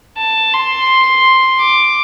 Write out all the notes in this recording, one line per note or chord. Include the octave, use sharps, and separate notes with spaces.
A5
C6
D6